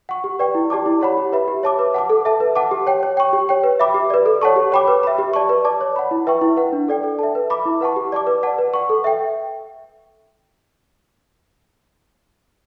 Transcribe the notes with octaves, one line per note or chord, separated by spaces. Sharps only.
F#5 C#6
G4
B4 D5 G5 C#6
E4
G4 D5 A5 D6
E4
G4 C#5 F#5 B5
G4
B4 E5 B5
G4
C#5 E5 A5 D6
B4
F#5 A5 D6
A4
E5 A5
B4
F#5 A5 D6
G4
C#5 G5
C#5
G5 C#6
G4
C#5 G5
B4
E5 B5 D6
G4
B4 D5
A4
C#5 F#5 A5 C#6
G4
C#5 G5 B5 D6
B4
E5 B5
G4
D5 A5 C#6
B4
D5 A5 D6
C#5
F#5 B5
E4
B4 E5 G5 C#6
E4
B4 F#5
D4
A4 D5 G5
A4
E5 A5
B4
E5 B5 D6
E4
B4 F#5 A5 C#6
G4
D5 A5 D6
B4
D5 F#5 A5
B4
F#5 C#6
A4
E5 G5